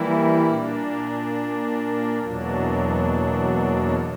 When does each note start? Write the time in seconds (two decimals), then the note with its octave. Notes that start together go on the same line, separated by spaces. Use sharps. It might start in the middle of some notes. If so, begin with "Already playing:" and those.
Already playing: E3 G3 A#3 E4
0.47 A#2 A#3 D4
2.20 E2 B2 F#3 A#3 D4